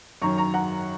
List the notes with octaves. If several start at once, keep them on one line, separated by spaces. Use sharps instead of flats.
F#2 D#3 F#3 A#5 C#6
A#5 C#6
F#5 A#5